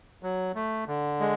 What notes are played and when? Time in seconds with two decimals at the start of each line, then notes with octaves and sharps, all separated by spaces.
0.23 F#3
0.55 A3
0.87 D3
1.20 G#3